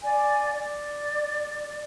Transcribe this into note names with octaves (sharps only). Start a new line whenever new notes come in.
D5 F5 G#5
D5